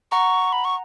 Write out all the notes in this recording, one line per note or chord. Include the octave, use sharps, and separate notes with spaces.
F#5 A#5 C#6
B5
C#6